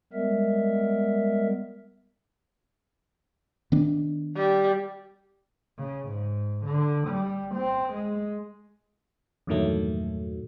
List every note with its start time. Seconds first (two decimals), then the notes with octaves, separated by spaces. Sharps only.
0.13 G3 G#3 B3 A#4 E5
3.72 D#3 B3 D4
4.36 G3
5.79 C#3
6.09 G#2
6.65 D3
7.08 G3
7.55 C4
7.93 G#3
9.47 E2 G2 A#2 D#3 F#3 A3